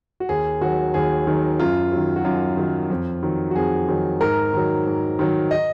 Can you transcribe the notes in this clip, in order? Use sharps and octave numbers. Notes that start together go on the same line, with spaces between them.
F#4
D#2 G#4
D#3 F#3 F#4
D#2 G#4
D#3 F#3
F#2 F4
D#3 F#3
F#4
F#2 F4
D#3 F#3
F2
D#3 F#3
F#4
F2 G#4
D#3 F#3
G#2 A#4
D#3 F#3
G#2
D#3 F#3
D#5